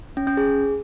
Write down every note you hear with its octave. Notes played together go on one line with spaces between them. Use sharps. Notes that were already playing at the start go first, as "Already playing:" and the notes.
C#4
C#4
G#4